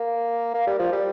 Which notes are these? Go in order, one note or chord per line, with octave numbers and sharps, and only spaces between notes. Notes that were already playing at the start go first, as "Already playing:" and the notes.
Already playing: A#3
A#3
G3
F3
G3